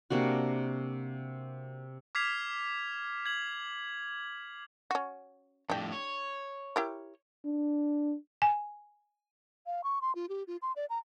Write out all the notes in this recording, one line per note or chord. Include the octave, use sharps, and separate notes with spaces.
C3 A#3 D4 F#4
D6 F6 G#6 B6 C7 F7
G#6 F#7
C#4 F#4
F2 A2 D4 G4
C#5
E4 G4 A#4
D4
G#5
F5
C#6
C6
F4
G4
F4
C6
D5
A#5